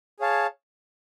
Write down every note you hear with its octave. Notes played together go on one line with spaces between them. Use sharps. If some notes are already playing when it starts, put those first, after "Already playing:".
G#4 C#5 F5 A5